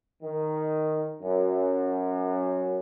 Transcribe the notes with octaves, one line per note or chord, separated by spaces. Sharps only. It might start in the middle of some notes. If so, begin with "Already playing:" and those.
D#3
F#2